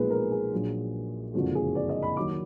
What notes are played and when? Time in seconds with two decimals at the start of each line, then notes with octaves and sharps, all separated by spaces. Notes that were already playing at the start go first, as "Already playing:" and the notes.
Already playing: B1 A#2 F3 G#3 B3 G#4 B4
0.10 A#4
0.31 G#4
0.52 A#1 A#2 F#3
1.34 F#1 F2 D3 F3 G#3 F#4
1.55 G#4
1.75 D5
1.89 D#5
2.03 B5
2.17 D#2 D#3 F#3 D6